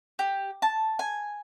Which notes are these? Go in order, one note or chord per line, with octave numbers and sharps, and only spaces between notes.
G4
A5
G#5